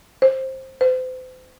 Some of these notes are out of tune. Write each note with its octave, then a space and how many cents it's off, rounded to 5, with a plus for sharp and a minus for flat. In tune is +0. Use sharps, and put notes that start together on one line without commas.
C5 +15
C5 -40